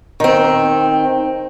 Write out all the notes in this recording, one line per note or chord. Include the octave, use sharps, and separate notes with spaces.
D#3 C4